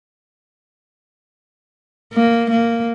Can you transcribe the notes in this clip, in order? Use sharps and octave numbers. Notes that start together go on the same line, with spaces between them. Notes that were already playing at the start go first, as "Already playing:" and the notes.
A#3
A#3